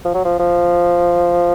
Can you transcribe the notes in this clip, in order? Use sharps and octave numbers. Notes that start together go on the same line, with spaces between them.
F3
F#3
F3
F3